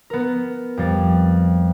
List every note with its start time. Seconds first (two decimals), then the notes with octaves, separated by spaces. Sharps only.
0.10 B3 A#4
0.77 F2 G3 A6